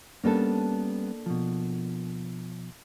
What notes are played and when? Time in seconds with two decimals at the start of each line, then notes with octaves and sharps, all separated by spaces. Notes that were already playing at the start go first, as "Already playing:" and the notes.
0.24 G3 A#3 B3 C#4 D4 A4
1.26 B2 F3